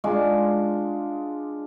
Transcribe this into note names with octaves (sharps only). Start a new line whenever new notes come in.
G#3 D4 F4